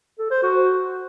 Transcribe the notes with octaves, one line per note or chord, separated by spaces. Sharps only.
A4
C5
F#4